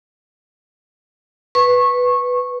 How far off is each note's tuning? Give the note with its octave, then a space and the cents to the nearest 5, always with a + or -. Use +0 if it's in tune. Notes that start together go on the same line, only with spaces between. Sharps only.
B4 +0 C#6 -20